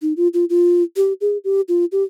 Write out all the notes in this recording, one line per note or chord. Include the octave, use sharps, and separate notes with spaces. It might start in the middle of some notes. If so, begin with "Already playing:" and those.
D#4
F4
F4
F4
G4
G#4
G4
F4
G4